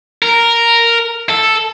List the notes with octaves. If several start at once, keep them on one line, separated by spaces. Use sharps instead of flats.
A#4
A4